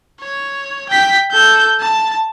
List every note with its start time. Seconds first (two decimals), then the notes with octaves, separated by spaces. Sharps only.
0.20 C#5
0.89 G5 B6
1.31 A4 G6
1.80 A5